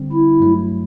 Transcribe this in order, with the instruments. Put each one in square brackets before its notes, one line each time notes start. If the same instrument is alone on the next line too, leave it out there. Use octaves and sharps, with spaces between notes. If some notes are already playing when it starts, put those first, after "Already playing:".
Already playing: [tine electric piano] D3 G3 C4
[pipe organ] E4
[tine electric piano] G2 F#3 A3